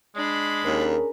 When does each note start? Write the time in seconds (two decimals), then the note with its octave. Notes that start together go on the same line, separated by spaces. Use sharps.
0.16 G#3 D4 B5
0.64 D#2 C#4 G#4 A#4